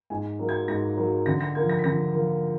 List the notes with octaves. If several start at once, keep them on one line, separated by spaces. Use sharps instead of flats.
G#2 G#5
F#3 A#3
G#6
G#2 A#6
F#3 A#3
D3 A#6
A#6
F3 A#3 G#6
A#6
B6
D3 A#6
F3 A#3